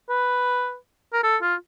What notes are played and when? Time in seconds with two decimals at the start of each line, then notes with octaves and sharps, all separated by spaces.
0.10 B4
1.13 A#4
1.23 A4
1.42 F4